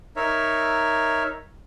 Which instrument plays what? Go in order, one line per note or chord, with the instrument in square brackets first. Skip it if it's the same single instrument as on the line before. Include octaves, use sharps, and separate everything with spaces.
[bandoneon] D#4 A#4 C#5 E5